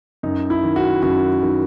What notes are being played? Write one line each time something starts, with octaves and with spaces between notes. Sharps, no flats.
F#2 D#4
E4
D#3
F#4
F#2 F#4
D#3